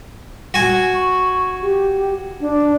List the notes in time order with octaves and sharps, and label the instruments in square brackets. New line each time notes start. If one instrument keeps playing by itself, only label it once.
[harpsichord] F#4 G#5
[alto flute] C#6
G4
D4